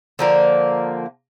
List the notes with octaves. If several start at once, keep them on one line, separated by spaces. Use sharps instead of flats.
D3 F3 A#3